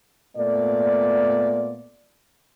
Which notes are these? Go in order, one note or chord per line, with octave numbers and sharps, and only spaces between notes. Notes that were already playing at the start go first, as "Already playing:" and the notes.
A#2 A3 B3 D5